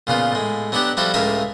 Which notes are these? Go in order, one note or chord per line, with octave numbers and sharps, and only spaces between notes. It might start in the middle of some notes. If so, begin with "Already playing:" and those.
A#2 C#3 B3 F4
A2 G#3
F#3 B3 D4 F#4 G4
F3 G3 E4 F#4 A4
C#2 A2 C#3 A#4 E5 D#6